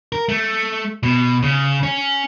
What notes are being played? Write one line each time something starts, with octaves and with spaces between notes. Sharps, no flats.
A#4
A3
B2
C#3
C#4